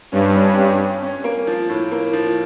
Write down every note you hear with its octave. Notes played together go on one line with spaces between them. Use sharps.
G2 C#4
C#4
C#4
C#4
C#4
A#3
F3
A2
A#3
F3